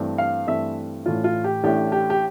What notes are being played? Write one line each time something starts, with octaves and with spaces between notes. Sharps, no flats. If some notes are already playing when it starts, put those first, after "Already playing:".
Already playing: G2 E3 A3 C4
F5
G2 E3 A3 C4 E5
A1 A2 E3 A3 D4 F4
F4
G4
A1 A2 E3 A3 D4 G4
G4
G4